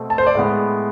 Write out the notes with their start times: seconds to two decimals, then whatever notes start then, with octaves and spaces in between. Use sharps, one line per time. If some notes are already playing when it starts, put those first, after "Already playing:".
Already playing: B2 A3 C4
0.10 A5
0.18 C5
0.27 D5
0.35 A2 G#3 B3